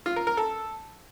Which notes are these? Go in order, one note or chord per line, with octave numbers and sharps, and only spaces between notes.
F4
A#4
A#4
A4